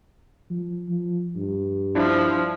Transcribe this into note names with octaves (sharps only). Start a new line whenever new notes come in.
F3
F3
G2
F3 D4 E4